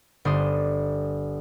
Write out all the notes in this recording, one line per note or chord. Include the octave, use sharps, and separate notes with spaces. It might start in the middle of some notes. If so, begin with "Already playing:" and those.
G1 D4 C5 D#6